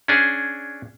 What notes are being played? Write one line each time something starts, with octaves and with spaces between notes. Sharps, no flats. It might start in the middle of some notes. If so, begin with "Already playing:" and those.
C#4 D4 G#4